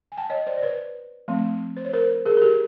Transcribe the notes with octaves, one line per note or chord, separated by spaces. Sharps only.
G#5
G5 A5
C#5 D#5
C5 D5
D5
B4 C#5
F3 A3 C4
C5
C#5
A#4 C5
G#4 A#4
A#4
G4 A4